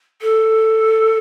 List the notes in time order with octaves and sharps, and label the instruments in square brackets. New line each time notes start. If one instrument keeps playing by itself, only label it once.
[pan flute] A4